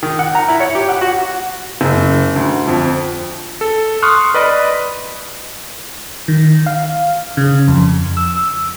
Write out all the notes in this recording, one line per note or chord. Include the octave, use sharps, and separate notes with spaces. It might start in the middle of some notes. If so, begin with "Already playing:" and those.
D#3
F#5
A#5
E4
C#5
G4
F#5
F#4
F#1
D2
F2
A4
C6 C#6 D#6 F6 F#6
B4 D5 D#5 B5
D#3
F5
C#3
F2
E6